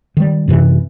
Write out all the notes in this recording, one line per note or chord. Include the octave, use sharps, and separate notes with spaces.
D#3 G3
F#2 C3 E3